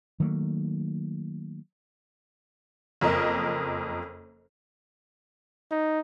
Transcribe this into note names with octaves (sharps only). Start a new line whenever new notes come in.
D#3 F#3 A3 A#3
F#1 F2 A#4 D#5
D#4